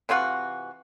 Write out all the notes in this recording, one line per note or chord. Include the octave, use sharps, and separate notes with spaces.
C3 E3 F4 F#4